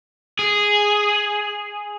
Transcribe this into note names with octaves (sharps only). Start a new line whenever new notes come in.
G#4